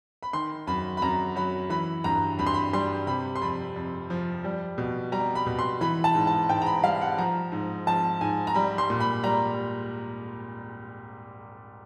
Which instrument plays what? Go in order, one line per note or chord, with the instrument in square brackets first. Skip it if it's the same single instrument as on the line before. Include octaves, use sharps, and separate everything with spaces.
[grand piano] B5
D#3 C6
F#2 B5
B5
F#2 A#5
F#3 B5
E3 B5
G2 A#5
G2 B5
C6
B5
G3 C6
C3 B5
C6
F2 B5
F2
F3
G3
B2
G3 A#5
B5
B2
C6
E3 B5
A5
G#2
A5
G#2 G5
A#5
B5
G3 F5
F#5
F3 A#5
G#2
F3 A5
G#2 G#5
A#5
G3 B5
C6
A#2
B5
G3 A#5